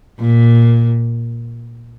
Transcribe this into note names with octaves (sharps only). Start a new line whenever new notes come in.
A#2